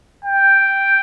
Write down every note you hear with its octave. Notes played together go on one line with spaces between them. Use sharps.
G5